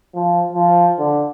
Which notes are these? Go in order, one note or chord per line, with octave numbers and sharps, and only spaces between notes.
F3
F3
D3